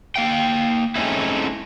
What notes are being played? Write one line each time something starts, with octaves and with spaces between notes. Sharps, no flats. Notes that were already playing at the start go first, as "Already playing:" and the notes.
A#3 F5 G5
G#3 A3 C4 C#4 D#4 E4